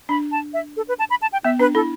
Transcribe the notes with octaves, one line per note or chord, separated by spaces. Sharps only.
D4 B5
A5
E5
A4
B4
A5
B5
A5
G5
B3 E5
D4 B4
E4 A4